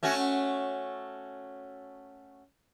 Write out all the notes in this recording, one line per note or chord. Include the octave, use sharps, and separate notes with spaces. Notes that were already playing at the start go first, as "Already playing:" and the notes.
A3 C#4 F#4